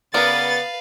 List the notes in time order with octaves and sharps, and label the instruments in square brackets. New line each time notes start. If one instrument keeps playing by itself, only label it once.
[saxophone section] C#3 B3 [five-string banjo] A#4 D5 [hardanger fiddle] B4 F5 [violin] A6